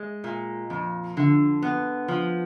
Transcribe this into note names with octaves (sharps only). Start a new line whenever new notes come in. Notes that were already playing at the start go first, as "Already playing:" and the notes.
Already playing: G#3
A#2
F2
D3
B3
F3